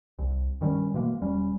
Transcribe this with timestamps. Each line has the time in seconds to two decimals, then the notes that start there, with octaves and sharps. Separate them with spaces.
0.19 C2
0.61 G2 D#3 G3 C#4
0.94 B2 E3 G#3 A#3
1.22 E1 G3 C#4